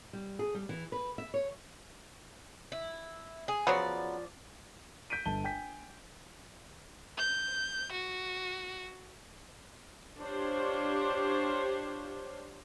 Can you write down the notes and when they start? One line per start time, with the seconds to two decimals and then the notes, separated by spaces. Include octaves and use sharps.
0.13 G3
0.39 G#4
0.55 G3
0.69 E3
0.92 B4
1.18 E5
1.34 C#5
2.72 E4
3.48 G#4
3.67 C#3 F3 F#3 B3 D5
5.10 G6 B6 D7 D#7
5.25 G1 A5 G7
5.44 G5 G#5 G6 B6
7.18 G6
7.92 F#4
10.21 D4 F4 G4 C5 C#5